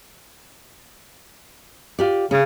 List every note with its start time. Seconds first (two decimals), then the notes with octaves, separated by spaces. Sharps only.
1.99 F4 G4 D5
2.31 C#3 C#4